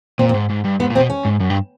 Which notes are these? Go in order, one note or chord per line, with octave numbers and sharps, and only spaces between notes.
A#2 C4
C4
G#2
G#2
G2
G#2 B3
A#2
C4
B2
C#4
G#2
F#2
G2